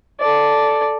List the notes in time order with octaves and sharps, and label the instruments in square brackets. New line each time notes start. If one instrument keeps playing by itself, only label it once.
[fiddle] A4 D5